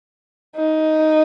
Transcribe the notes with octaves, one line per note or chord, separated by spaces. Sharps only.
D#4